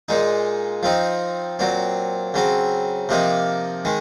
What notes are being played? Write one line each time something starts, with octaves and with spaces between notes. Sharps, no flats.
A#2 G#3 D#4
F3 C4 D#4
A#2 F#3 C4
C#3 F#3 C4
C3 F3 A#3 D#4
D#3 G#3